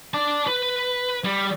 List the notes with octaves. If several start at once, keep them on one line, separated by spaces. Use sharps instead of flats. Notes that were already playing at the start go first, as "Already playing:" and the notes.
D5 A5
B4
G3